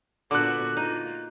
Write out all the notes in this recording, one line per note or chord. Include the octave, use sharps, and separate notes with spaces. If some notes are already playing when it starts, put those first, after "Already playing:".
A#2 D3 B3 F#4 D6 F#6
A#3 D#4 F4